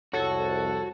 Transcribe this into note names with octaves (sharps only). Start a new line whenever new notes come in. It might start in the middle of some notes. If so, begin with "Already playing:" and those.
C2 F2 F#4 A4 C#5